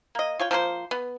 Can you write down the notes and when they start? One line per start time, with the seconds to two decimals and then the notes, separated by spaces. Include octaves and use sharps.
0.15 A#3 D#5
0.39 F4 C#5 G5
0.51 F3 A#3 A#4 C5
0.91 B3